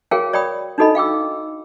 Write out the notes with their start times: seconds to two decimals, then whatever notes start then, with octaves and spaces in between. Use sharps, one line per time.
0.11 F#4 G#4 A#4 C#5 F5 G5
0.33 C#5 D5 G5 B5 D#6
0.78 D4 D#4 F#4 A4 D#5 B5
0.95 F5 G5 D6 E6